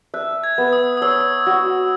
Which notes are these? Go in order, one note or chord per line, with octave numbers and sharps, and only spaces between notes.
E5 F#6
G#6
B3
D#6
D#6
C#5 E6
F#4